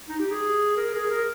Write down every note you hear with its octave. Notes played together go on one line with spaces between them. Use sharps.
D#4
G4
G#4
A#4
G#4
A#4